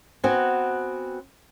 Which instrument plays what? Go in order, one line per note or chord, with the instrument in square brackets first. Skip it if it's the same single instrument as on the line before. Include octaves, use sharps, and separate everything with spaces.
[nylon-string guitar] B3 C4 F#4 G#5